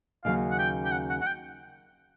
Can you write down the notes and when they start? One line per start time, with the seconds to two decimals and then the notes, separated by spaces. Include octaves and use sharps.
0.24 D#2 C#3 F#3 F5
0.51 F#5
0.59 G5
0.85 G5
0.92 F#5
1.09 F#5
1.21 F#5
1.26 G5